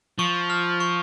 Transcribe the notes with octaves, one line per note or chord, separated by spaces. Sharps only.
F3 C#6
F6
C#6